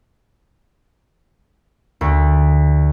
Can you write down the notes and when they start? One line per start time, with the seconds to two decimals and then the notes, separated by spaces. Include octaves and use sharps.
2.01 D2